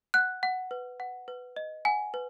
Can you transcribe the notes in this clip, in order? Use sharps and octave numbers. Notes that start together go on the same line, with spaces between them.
F#5 F#6
F#5
B4
F#5
B4
D#5
F#5 G#5
B4